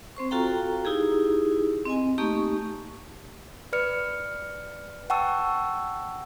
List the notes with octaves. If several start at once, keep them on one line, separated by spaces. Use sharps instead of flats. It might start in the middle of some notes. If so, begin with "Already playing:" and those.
C4 C5 C#6
F4 F#4 A4 F5 G5 A#5
D#4 E4 G4 G#4
C4 D#5 G#5
A3 A#3 D#4 G4 C#6
B4 D5 F6 C#7
F#5 G5 A5 C#6 E6